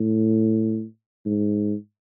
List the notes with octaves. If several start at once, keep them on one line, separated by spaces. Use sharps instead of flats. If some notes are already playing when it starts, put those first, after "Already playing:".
Already playing: A2
G#2